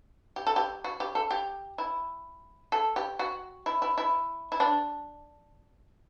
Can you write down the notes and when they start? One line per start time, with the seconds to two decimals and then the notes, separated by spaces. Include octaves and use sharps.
0.36 G4
0.47 A4
0.56 G4
0.84 F#4
1.00 G4
1.15 A4
1.31 G4
1.78 E4
2.72 A4
2.96 G4
3.19 F#4
3.66 E4
3.82 E4
3.98 E4
4.52 E4
4.60 D4